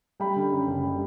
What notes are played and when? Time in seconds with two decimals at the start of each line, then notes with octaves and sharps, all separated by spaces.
0.20 G3 G5 B5
0.36 D3
0.52 F#2
0.68 F#1
0.83 G3